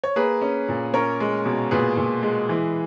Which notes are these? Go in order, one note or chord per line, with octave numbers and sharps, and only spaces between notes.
C#5
A#3 G#4 B4
C#4
A#2
C#4 A#4 C#5
G#3
B2
A#2 G#4 B4
A#2
G#3
E3